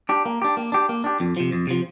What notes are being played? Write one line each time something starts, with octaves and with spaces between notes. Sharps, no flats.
D4 G4
A#3
D4 G4
A#3
D4 G4
A#3
D4 G4
F2
C3 F3
F2
C3 F3